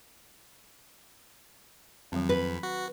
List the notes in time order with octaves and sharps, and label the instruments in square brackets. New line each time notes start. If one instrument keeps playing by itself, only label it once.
[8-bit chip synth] F2 [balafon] D#3 F#3 C4
[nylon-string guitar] B4
[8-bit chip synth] F#4